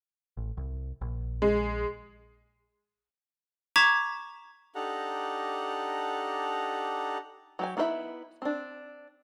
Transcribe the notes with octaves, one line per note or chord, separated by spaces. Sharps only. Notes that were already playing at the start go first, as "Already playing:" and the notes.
A1
C2
A#1
G#3
A#5 C#6 D6 G#6 B6 E7
D4 D#4 G4 A4 F#5 A#5
F#3 G4 G#5
B3 D#4 E4 C5 E5
C4 D4